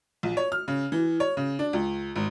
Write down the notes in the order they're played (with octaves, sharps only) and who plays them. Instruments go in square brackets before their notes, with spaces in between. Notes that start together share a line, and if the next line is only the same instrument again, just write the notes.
[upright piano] A#1
C#5
F6
C#3
E3
C#5
C#3
D4
C#2
G#1